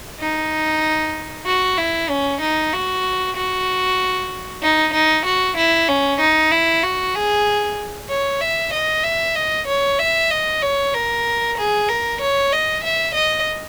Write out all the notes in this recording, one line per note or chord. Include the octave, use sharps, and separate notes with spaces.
D#4
F#4
E4
C#4
D#4
F#4
F#4
D#4
D#4
F#4
E4
C#4
D#4
E4
F#4
G#4
C#5
E5
D#5
E5
D#5
C#5
E5
D#5
C#5
A#4
G#4
A#4
C#5
D#5
E5
D#5